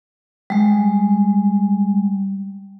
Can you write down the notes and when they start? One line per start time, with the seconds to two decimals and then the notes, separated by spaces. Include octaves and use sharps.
0.50 G3 G#3